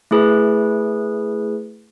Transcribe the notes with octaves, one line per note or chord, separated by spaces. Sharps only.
A3 E4 G#4 B4